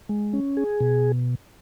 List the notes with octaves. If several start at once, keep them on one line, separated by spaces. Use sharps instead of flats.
G#3
C#4
G#4
B2